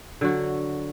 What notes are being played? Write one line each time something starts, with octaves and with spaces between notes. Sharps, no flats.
D3 F#3 F#4